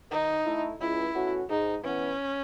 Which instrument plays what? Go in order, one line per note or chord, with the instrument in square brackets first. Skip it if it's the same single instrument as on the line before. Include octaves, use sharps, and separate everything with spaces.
[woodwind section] D#3 [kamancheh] D#4
[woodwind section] A3 E4
[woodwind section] C#2 [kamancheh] E4
[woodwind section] B2 A3 C#4 F#4
[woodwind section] G#2 [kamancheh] D#4
[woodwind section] E3 B3 [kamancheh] C#4